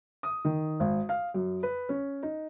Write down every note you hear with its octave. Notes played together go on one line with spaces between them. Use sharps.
D#6
D#3
G#1
F5
F#2
B4
C#4
D#4